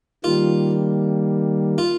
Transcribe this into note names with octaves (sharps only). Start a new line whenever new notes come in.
D#3 G3 A#3 F4
F4